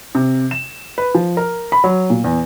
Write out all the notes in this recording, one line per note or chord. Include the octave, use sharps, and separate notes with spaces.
C3
E7
B4
F3
A#4
B5
F#3
A#2
E2